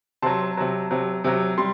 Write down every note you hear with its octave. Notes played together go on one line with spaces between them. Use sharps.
C3 F#3 A5 C6
C3 F#3
C3 F#3
C3 F#3
G3 C6